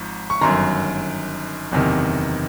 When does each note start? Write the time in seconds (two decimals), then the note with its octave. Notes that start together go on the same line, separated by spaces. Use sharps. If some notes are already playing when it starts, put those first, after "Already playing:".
Already playing: G#1 G#2 F3
0.30 C#6
0.41 G1 F#2 D#3 A#5 C6
1.72 F#1 E2 C3 D#3